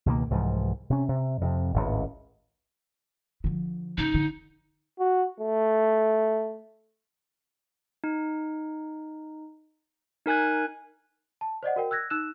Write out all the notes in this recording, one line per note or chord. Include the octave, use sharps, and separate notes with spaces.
C#2 B2 D#3 A#3
C2 G#2 E3 F3
C3 C#4
C3
F2 C3
G#1 C#2 A2
D3 F3
C#3 D#4
D3
F#4
A3
D#4
D#4 A#4 G#5 F#6 G#6
A5
C5 D5 D#5 F#5
F#4 A#4 G5
E6 F#6 G#6 A#6
D#4 E6 F#6 E7